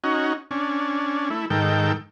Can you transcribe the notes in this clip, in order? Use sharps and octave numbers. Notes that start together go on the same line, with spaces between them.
C#4 D#4 F#4
C#4 D4
A3 E4
G#2 D#3 A4 G5